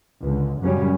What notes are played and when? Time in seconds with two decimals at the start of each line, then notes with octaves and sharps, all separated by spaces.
0.22 C#2 D3
0.60 F#2 C#3 F#3 G3 C#4